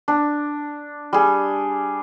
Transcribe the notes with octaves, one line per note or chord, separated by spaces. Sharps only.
D4
G3 G#4